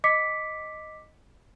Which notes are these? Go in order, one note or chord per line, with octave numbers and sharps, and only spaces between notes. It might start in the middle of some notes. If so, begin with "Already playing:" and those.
D#5 D6 B6 C#7